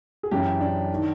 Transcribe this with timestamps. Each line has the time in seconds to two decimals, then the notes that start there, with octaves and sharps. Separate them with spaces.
0.23 G#4
0.31 F#2 C#3 E3 G4
0.61 D4
0.94 D#3